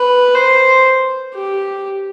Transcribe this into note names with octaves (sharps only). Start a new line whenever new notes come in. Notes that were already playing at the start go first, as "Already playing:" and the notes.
Already playing: B4
C5
G4